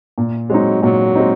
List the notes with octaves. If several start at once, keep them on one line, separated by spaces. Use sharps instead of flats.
A#2
F#3 G#3 C4 D#4
A#2 F#3
G#3 C4 D#4